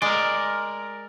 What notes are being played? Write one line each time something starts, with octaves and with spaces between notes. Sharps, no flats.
G#3 A#4 D5